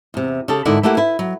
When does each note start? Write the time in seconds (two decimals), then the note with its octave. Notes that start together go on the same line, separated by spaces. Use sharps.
0.14 E2 C3
0.48 C#3 G4 A4
0.65 G#2 D3 E4 A#4 D5 F#5
0.83 A3 A#3 E4 G4 F#5
0.97 E4 B4
1.19 F#3